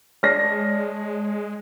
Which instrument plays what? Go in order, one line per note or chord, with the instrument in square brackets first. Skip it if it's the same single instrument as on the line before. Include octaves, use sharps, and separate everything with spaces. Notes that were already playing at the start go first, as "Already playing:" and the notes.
[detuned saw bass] G#3 [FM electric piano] C#5 D5 A5 [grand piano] F6 A#6 C7